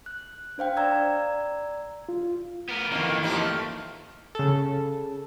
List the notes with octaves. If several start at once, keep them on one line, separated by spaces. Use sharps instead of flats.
F#6
D4 C5 F5 G5
D5 A#5 E6 G#6
F4
B3 A#4
F2 D#3 E3 A#3
F3 D#4 G4
A3
C#3 A4